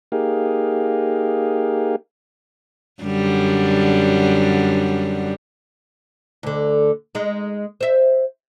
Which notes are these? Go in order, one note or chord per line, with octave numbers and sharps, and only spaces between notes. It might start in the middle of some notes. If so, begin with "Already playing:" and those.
A#3 D#4 G4 G#4 F5
F#2 D3 G3
D2 D3
G#3 D#4
C5 E5